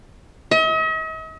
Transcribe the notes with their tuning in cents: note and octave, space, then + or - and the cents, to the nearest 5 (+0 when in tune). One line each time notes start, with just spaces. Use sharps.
D#5 +45